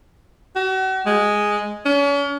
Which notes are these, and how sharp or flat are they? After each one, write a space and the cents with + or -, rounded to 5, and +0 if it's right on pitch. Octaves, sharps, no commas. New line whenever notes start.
F#4 +40
G#3 +0
C#4 +40